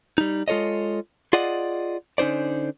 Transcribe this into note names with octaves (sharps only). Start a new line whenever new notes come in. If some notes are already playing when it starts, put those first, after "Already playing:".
G3 D#4
G#3 F4 A4 C#5 D#5
F4 G#4 D5 D#5 F#5
D3 C#4 D#4 C5 D5